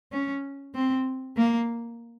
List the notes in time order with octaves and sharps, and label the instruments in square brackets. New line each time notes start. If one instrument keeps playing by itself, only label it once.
[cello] C#4
C4
A#3